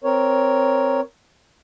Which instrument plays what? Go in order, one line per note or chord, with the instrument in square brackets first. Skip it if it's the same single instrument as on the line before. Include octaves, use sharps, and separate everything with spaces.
[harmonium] C4 A#4 C#5